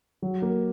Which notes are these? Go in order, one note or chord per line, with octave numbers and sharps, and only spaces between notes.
F#3
A#3